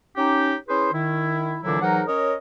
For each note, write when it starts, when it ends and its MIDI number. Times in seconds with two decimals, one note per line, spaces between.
0.17 0.55 61
0.17 0.55 63
0.17 0.55 67
0.69 0.89 61
0.69 0.89 64
0.69 0.89 68
0.69 0.89 71
0.69 0.89 72
0.93 1.58 51
0.93 1.58 64
1.64 1.79 46
1.64 1.79 50
1.64 1.79 52
1.64 1.79 54
1.64 1.79 62
1.64 1.79 64
1.81 2.03 44
1.81 2.03 52
1.81 2.03 54
1.81 2.03 63
1.81 2.03 70
1.81 2.03 78
2.08 2.35 61
2.08 2.35 70
2.08 2.35 73
2.08 2.35 75